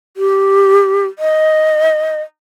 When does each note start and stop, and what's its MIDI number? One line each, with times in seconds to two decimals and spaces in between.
0.17 1.06 67
1.19 2.21 75